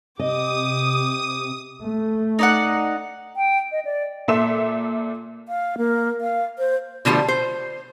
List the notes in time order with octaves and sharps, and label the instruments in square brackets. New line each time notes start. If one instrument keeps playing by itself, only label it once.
[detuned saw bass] C3 [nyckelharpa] G4 D6 [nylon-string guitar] D#5 [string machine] D#6
[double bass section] A3
[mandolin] D#4 D5 F#5
[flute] G5
D#5
D5
[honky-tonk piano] A#2 A4 E5 C6 E6 E7
[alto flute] F5
A#3
F5
C5
[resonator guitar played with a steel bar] B2 D3 F3 A3 G4
C5